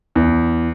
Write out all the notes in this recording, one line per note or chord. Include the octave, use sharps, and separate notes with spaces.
E2